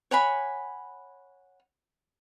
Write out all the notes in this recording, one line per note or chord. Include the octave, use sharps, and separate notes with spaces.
C#5 F#5 G#5 B5